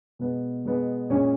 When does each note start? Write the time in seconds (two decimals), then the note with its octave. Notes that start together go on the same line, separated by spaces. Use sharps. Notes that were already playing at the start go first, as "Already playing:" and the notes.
0.19 B2 G#3 B3
0.65 B2 G#3 B3
1.10 A#2 G#3 C#4 C#5